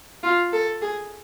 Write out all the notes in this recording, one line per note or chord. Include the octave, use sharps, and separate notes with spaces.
F4
A4
G#4